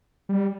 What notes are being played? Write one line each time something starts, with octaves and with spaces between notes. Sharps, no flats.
G3